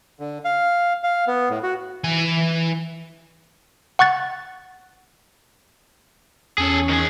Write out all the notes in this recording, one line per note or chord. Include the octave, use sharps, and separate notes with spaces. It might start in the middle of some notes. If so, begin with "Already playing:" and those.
D3
F5
F5
B3
A2
F#4
E3 G#5
F#5 C#6 F#6 A6
E2 C#4 G#4 A4 C#5
D#3 G#4